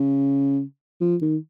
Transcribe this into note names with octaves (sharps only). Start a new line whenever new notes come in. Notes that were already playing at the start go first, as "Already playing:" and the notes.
Already playing: C#3
F3
D#3